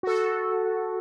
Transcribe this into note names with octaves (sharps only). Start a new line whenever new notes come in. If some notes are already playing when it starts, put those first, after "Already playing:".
F#4 A4